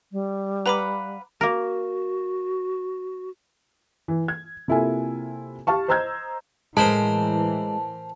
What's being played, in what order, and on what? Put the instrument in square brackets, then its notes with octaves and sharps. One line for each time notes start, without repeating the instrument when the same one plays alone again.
[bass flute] G3
[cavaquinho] B4 F5 F#5 [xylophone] A#5 B5 D6
[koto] A#3 A#4 [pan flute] F#4
[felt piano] E3
G#6
C3 A#3 E4 F4 A4 G#5
G4 F5 A5 C#6
C5 D#5 A#5 E6 G6 G#6
[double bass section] A2 E3 [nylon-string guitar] G#3 [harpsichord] A#4 C5 B5 [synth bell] A5